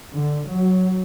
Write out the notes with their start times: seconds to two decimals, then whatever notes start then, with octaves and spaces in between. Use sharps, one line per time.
0.14 D3
0.49 F#3